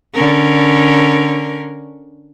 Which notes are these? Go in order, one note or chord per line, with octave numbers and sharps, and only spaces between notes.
D3 C#4 A#4